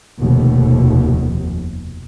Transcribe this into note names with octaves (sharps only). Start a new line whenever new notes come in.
F1 D#2 B2